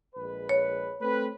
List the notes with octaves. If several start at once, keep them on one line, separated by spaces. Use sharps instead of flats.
A#1 G#3 B4
C#5
A3 C4 B4